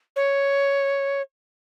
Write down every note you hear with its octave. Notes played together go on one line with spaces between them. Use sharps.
C#5